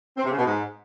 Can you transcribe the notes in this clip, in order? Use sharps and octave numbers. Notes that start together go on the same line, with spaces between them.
C4
C3
C#3
B2
G#2